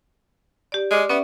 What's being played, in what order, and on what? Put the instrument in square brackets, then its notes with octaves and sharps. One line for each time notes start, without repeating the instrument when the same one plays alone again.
[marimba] G4 D5
[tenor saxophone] G#3 [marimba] D5 D6 F6
[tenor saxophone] B3 [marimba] C#4 D5 E5